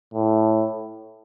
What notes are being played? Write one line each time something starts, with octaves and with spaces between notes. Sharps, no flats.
A2